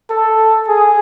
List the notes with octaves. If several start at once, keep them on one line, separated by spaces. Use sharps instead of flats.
A4
G#4